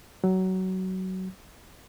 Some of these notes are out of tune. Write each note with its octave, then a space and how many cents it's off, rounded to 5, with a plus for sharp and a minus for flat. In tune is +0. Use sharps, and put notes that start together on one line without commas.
F#3 +20